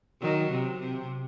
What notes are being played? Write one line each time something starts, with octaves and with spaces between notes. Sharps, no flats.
D#3 F#3
C3
C3